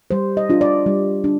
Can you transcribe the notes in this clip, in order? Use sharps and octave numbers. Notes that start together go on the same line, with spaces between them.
G3 C5
D#5
D4 F4
D5
G3
D4